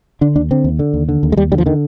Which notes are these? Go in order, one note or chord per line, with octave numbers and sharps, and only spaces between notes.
D3 D4
D#2 D4
D3 C4
D#2
D3
D#2
D3
D#2
G#3
D#2 G3
D3 G3
F3
D3 D#3